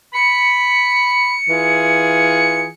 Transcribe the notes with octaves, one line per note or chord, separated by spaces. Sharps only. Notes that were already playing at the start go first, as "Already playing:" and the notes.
B5 C#7
E3 F4 G#4